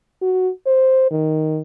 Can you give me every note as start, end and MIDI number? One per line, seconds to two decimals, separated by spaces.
0.22 0.50 66
0.67 1.07 72
1.11 1.61 51